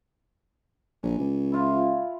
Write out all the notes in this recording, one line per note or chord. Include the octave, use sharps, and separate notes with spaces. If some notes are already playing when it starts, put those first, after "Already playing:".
A#1 G#5
C#2
E4 F4 F5